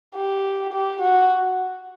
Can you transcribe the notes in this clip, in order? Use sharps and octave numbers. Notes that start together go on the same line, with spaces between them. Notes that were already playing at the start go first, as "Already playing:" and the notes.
G4
G4
F#4